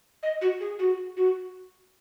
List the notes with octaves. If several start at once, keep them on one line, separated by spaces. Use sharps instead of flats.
D#5
F#4
G#4
F#4
F#4